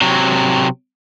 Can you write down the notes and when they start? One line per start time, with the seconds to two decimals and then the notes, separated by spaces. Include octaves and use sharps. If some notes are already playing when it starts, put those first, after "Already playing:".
0.01 C3 F#3